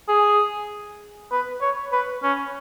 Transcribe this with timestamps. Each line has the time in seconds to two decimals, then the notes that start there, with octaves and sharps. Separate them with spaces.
0.09 G#4
1.32 B4
1.62 C#5
1.92 B4
2.23 C#4